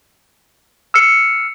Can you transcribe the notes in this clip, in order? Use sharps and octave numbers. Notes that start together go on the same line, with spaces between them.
E6 F6 C7 C#7